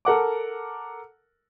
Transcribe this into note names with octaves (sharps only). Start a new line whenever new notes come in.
A4 A#4 F#5 D6